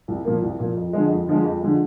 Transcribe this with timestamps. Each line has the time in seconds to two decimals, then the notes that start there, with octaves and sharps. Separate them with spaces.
0.08 C2
0.25 A#2 F3 A#3
0.42 C2
0.59 A#2 F3 A#3
0.76 F2
0.93 D3 F3 G#3
1.10 F2
1.27 D3 F3 G#3
1.44 F2
1.61 D3 F3 G#3